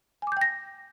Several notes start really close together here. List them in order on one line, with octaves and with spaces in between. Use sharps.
G#5 D6 G6 G5 A#6